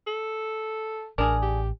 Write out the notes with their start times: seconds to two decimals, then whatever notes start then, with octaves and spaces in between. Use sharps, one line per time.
0.07 A4
1.18 A1 D4 G#4 A#4
1.42 G4